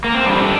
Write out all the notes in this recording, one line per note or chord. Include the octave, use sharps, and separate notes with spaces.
A#3
C4
F2 D3 G3 D4